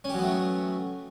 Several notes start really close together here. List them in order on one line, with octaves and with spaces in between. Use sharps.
C#4 G4 F#3 B3 A3